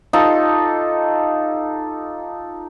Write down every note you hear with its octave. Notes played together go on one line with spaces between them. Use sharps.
D#4 F4 G4 A4